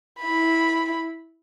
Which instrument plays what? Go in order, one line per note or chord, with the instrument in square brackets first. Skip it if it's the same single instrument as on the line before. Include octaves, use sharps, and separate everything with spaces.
[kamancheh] E4 B5